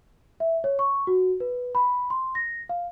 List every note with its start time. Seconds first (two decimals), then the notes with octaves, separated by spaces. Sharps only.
0.40 E5
0.64 C#5
0.79 C#6
1.07 F#4
1.40 B4
1.75 B5
2.10 C6
2.35 A#6
2.69 F5